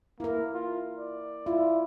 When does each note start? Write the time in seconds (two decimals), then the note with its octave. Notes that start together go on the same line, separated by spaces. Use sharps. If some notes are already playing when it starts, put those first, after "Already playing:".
0.20 A#3 E4 A#4
0.54 F4
0.99 D5
1.46 E4 F4